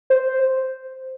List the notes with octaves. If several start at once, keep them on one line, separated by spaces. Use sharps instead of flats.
C5